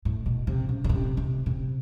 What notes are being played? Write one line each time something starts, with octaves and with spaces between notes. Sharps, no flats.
A2
B2
C3
C#3
C#3
C3
C3
C3